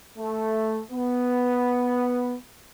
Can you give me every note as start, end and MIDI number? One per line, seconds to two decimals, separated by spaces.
0.18 0.79 57
0.91 2.36 59